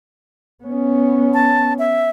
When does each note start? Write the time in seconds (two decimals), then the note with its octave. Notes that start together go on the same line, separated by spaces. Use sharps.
0.64 B3 C#4
1.34 A5
1.79 E5